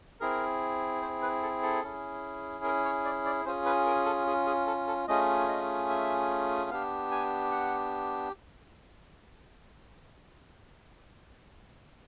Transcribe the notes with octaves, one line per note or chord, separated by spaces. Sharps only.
C4 E4 G#4 A#4
C5
B4
A4
A4
C#4 E4 G#4
A#4
C#5
D5
D5
C#4 F4 G#4 C5
B4
A#4
A4
G#4
G#4
A4
A4
A3 C#4 F4 G#4 D#5
D#5
E5
B3 D4 G4 F5
G#5
F#5